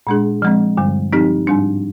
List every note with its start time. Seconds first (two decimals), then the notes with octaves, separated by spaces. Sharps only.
0.07 A#2 G#3 D4 G#4
0.42 F3 G#3 C4
0.77 G2 D3 G3
1.13 F3 C4 D#4 G4
1.47 G#2 G3 D4